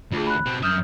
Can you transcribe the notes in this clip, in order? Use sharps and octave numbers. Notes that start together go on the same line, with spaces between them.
D2 F4 G#4
B5 F#6
B2 C4
F#2 E5 D#6 F6 G6